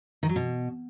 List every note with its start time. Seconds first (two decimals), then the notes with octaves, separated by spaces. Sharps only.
0.23 D#3
0.29 F#3
0.36 B2